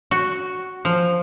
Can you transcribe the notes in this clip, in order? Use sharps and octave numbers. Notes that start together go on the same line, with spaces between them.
F#4
F3